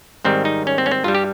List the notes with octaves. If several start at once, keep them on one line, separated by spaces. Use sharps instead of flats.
G#2 D#3 G3 C4
D#4
C#4
C4
C#4
C4
G2 G3 F4
G4